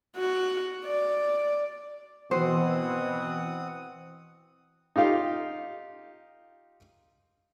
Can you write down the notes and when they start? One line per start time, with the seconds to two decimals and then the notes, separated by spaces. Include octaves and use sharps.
0.17 F#4
0.85 D5
2.31 B2 E3 C4 C5 F#5 D#6
4.96 D#4 F4 G4 F5